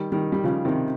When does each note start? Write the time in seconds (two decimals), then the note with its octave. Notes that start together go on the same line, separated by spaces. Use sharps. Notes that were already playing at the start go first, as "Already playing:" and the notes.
Already playing: D#3 G3
0.12 D#3 G3
0.32 G3
0.44 C#3 F3
0.65 C3 D#3